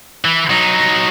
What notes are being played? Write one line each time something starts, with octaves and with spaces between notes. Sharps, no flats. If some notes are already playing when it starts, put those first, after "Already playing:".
E3
F#3 D#4